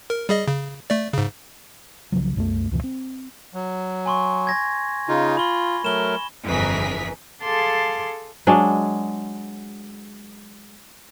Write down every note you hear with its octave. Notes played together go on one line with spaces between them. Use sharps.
A#4
G3 G#4 D#5
C#3
A3 D5
G#2 C#3
C2 C#3 F3 F#3
C2 F#2 G3 A3
C#2 F#2 B2 E3
C4
F#3
G#5 C6 C#6
G#6 A#6
C#3 D#4 F4
F4 B5 G7
F#3 A3 A#4 E7 G7
G1 F2 E3 G#4 A#4 B6
G#4 A4 F5 A5 C6 D6
F#3 G#3 D4